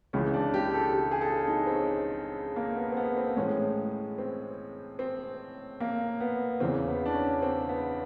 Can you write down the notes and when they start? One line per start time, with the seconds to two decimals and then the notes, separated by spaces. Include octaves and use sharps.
0.13 C#2 C#3 E3 C#4
0.34 D4
0.54 G4
0.74 A4
0.94 G4
1.11 G#4
1.21 A4
1.48 D#4
1.67 C4
1.75 C#4
2.56 A#3
2.76 B3
2.92 C4
2.97 B3
3.17 C4
3.37 A2 E3 G#3 C#4
4.18 C4
4.99 C4
5.80 A#3
6.20 B3
6.60 E2 C#3 E3 C4
6.88 B3
7.06 D4
7.14 C#4
7.42 C4
7.69 B3